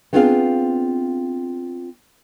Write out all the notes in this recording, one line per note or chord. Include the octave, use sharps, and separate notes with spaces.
B3 C4 D4 F4 G#4 F5